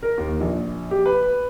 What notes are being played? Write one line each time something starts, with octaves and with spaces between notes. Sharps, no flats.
A#4
D#2
A#1
G4
B4